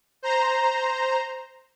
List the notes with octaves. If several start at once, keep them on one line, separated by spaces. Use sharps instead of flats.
C5 A#5